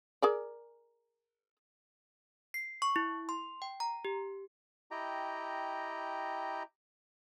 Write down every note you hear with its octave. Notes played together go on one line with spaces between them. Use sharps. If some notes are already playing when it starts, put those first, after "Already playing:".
G#4 A#4 D5
C7
C#6
E4
C6
G5
A#5
G4
E4 G4 D#5 G5 A#5